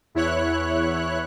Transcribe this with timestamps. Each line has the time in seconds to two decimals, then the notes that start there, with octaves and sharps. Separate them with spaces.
0.15 E2 E4 C#5 F#6